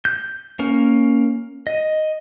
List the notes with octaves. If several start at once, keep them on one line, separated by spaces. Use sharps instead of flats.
G6
A#3 C#4 A#4
D#5